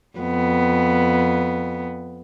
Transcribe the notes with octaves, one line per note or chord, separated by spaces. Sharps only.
F2 B3